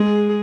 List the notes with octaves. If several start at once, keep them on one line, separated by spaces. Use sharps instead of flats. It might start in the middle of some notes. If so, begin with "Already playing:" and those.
Already playing: G#3 G#4